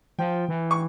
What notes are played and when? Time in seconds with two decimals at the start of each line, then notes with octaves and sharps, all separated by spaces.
0.19 F3 G5
0.48 E3
0.71 C#6